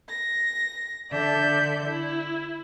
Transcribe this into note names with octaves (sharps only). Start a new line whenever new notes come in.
A#6
D3 D5 E5 G6
E4